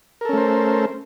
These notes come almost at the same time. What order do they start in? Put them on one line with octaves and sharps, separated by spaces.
A#4 A4 C#4 A3 C5